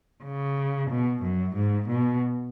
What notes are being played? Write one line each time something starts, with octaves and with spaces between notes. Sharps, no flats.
C#3
B2
F#2
G#2
B2